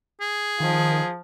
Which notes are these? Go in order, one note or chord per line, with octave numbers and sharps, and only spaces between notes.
G#4
D#3 F3